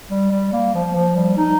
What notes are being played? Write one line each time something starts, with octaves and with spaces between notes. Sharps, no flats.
G3
G3
A#3
F3
F3
G3
D#4